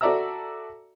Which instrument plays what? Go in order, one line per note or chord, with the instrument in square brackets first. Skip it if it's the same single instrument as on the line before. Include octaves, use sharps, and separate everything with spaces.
[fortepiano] F#4 A4 D5 E5 A#5 E6